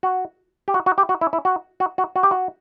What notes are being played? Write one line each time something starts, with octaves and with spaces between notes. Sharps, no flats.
F#4
G4
F#4
F#4
G4
F#4
E4
E4
F#4
F#4
F#4
F#4
G4
F#4